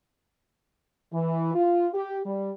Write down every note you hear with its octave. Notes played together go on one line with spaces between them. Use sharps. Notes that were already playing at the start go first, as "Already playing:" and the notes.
E3
F4
G4
G3